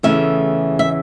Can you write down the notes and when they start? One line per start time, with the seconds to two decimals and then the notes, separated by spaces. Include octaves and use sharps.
0.03 E2 C#3 E3 A3 E5
0.79 E5